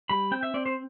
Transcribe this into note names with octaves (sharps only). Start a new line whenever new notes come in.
G3 B5
C4 G5
E5
C4 D5
C5